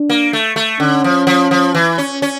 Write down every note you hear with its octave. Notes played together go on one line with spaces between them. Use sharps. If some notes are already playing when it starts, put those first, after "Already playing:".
Already playing: D4
A#3
A3
A3
D3 C#4
F3
F3
F3
E3
C#4
C#4